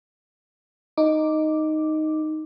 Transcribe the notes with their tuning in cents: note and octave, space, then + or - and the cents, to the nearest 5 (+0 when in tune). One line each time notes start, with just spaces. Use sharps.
D#4 +0 D6 +0